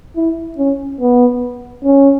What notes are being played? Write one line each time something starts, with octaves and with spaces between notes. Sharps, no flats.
E4
C#4
B3
C#4